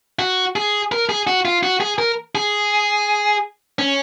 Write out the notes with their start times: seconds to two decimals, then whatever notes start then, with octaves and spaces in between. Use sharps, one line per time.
0.19 F#4
0.56 G#4
0.92 A#4
1.09 G#4
1.27 F#4
1.45 F4
1.63 F#4
1.81 G#4
1.98 A#4
2.35 G#4
3.79 C#4